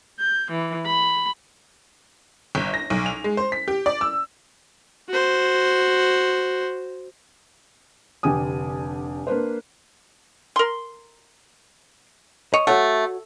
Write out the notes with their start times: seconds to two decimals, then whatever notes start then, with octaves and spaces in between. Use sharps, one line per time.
0.19 G6
0.49 E3
0.85 B5
2.55 G1
2.74 A#6
2.90 B1
3.06 F7
3.24 G#3
3.37 C5
3.52 B6
3.68 G4
3.86 D5
4.01 E6
5.09 F#4 C5
8.23 F1 D3 G4 G#5 D#6
9.27 A#3 D4 B4 C5
10.56 A#4 C6
12.54 C#5 D#5
12.67 A3 F#4 C#5 F#5